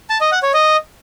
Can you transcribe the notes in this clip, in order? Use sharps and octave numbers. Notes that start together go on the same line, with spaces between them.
A5
D#5
F#5
C#5
D#5